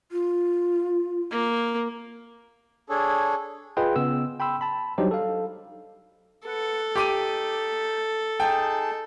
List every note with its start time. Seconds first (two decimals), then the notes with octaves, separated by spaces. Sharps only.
0.12 F4
1.31 A#3
2.89 D4 G#4 A4 C#5
3.77 F4 G#4 B4 D#5 G5 C6
3.96 C#3 B3 E6
4.40 G5 B5 C6 E6
4.61 A5 B5
4.98 F#3 G3 D4 D#4 G4 C5
5.11 A4 F5
6.46 A4 B4 F#5
6.96 D#4 G4 D6 D#7
8.40 D#4 G#4 G5 A5